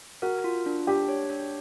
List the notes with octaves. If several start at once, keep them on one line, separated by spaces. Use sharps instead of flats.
F#4 A#4 F#5
F4
D4
D4 G4 G5
C#5
D4